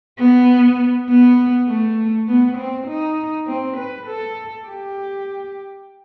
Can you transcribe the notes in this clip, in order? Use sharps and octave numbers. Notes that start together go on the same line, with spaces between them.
B3
B3
A3
B3
C4
D#4
C4
B4
A4
G4